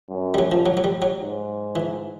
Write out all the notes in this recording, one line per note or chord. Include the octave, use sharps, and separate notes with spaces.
F#2
G3
F#3
F3
F#3
F#3
G3
F#3
G#2
E3